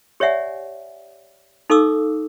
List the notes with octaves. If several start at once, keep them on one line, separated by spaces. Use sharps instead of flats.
G4 C#5 D5 E5 F#5 G#5
D#4 A4 F5 C#6 D6 E6